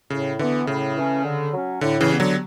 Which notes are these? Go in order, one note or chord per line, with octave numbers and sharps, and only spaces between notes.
A2 C#3
D3 E3 B3
A2 C#3
E3 A3 C#4
D3
F#3 C#4
A2 D3
C#3 E3
G3 B3
D3 F#3